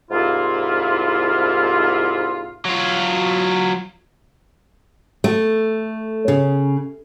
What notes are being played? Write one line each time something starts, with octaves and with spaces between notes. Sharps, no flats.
C2 G#2 A#3 E4 F4
F#3 F4
A3
C#3